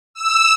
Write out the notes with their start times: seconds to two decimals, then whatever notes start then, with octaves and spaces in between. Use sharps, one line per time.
0.14 E6